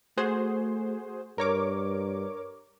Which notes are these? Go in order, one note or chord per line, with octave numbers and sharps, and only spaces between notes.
A3 F#4 G#4 C5
G2 A#4 C#5 D6